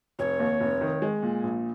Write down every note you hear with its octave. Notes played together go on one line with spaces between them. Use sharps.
F1 C#5
D#2
F1
D#3
G#3
A#2
A#1